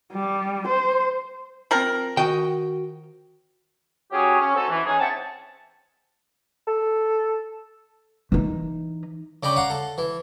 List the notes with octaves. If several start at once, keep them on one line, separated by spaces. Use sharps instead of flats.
G3
C5
F3 C4 A#4 G5 F#7
D#3 F#4 D#5 G5
F#3 C#4 G4 G#4
C#4
C4 C#4 D#4 F#4 A4
E3
C#4 D#4 G#4
C4 E5 F#5 G5 A5
A4
E3 D#4
C#3 D4 D#5 G5 B5 D6
F5 F#5 A#5
A4
E3